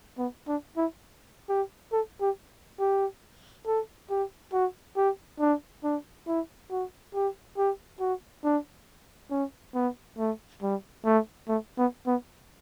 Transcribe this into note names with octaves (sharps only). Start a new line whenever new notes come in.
B3
D4
E4
G4
A4
G4
G4
A4
G4
F#4
G4
D4
D4
E4
F#4
G4
G4
F#4
D4
C#4
B3
A3
G3
A3
A3
B3
B3